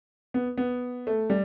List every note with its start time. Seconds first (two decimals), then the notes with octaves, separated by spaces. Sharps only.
0.34 B3
0.57 B3
1.07 A3
1.30 G3